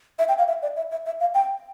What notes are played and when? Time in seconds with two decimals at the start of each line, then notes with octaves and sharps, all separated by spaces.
0.19 E5
0.28 G5
0.38 F5
0.48 E5
0.62 D5
0.77 E5
0.91 E5
1.06 E5
1.20 F5
1.34 G5